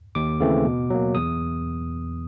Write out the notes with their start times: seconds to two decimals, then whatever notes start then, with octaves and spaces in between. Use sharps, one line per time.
0.15 D#2 D6
0.40 C#3 E3 A3 C4
0.65 B2
0.90 F#3 A#3
1.15 E2 D#6